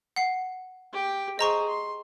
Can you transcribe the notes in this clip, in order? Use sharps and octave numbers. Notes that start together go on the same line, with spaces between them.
F#5 C7
G4 G5
G#4 C5 D#5 A#5 C#6
C6